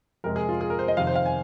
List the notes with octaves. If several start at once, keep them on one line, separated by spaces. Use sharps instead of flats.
F2 C3 G#3 C4 A#4
G#4
F4
G#4
A#4
C5
D#5
F2 C3 D#3 F5
C5
F5
G#5